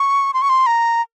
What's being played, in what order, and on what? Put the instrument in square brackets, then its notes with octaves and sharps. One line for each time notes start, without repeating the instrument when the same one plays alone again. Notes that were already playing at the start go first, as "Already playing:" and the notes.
Already playing: [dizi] C#6
C6
C#6
C6
A#5